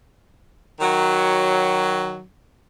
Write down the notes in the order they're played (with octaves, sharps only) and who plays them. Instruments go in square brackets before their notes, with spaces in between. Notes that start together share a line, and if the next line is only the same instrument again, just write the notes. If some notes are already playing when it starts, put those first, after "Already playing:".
[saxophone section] D#3 F#3